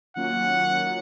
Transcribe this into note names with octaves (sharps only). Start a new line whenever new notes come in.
D#3 F#3 A#3 C#4 F4 F#5
D#3 F#3 A#3 C#4 F4